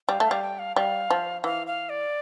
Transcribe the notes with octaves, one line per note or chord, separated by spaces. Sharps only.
G3 F5
A3 F5
G3
G5
F5
G3 F5
F3
E3 F5
F5
D5